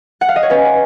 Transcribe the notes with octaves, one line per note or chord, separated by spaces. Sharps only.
F#5
F5
D#5
C#5
C#4 B4